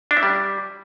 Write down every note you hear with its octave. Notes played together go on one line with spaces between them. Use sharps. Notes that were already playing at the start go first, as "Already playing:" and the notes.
D4
E4
G3